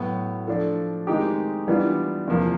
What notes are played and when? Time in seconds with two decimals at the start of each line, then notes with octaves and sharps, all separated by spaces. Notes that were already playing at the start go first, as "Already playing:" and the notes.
Already playing: A2 F#3 B3 E4
0.47 F3 A3 D4 F4 A4
1.07 D#3 G#3 C4 D#4 G4
1.68 E3 G3 B3 D4 F4
2.27 E2 C3 F3 A#3